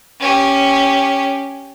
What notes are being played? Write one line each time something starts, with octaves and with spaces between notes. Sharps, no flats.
C#4 G4